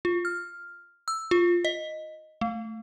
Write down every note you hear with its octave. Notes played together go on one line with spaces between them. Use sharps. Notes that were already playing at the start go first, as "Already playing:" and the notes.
F4
F6
E6
F4
D#5
A3